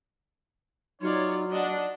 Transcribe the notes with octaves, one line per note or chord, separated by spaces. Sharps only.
F#3 D#4 F4 C#5 D5
D4 D5 D#5 F#5